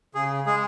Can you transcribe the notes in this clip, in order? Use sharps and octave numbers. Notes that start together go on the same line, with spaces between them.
C#3 G#4
G#3 G#4